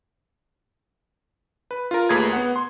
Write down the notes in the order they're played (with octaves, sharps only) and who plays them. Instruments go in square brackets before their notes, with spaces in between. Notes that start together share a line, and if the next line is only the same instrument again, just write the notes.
[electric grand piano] B4
F4 A#4
D#2 A3 G#4 B4 A#5 G#6
B3 F#5
C6